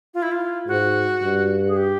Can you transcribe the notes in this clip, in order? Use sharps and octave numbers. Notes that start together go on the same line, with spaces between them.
F4
E4
F4
G#2 F#4
G2
G#4
G4